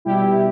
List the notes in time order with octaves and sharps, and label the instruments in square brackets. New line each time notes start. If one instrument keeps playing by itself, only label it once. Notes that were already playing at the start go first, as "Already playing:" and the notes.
[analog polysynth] B2 G3 E4 G4